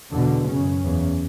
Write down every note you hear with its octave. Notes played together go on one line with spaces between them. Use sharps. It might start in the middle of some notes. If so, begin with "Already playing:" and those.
E2 B2 D3
F#2 C#3 C#4
E2 C#3